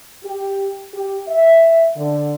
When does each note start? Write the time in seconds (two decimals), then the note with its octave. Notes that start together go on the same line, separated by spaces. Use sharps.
0.25 G4
0.94 G4
1.28 E5
1.96 D3